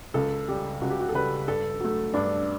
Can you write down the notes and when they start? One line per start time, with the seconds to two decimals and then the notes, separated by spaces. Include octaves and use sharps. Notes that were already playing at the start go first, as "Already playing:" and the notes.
0.14 C#2 A4
0.48 C#3 G3 G4
0.82 C#2 F#4
0.91 G4
1.01 F#4
1.09 A4
1.14 C#3 G3 B4
1.48 G2 A4
1.80 F#3 A3
2.14 G2 D4